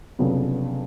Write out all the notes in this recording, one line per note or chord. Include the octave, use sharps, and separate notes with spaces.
F1 F2 C#3 F#3 B3